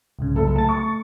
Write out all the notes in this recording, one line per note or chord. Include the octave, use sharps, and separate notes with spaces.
C2 G#2 C#3
F#1 A4
A3 A5 A6
C#6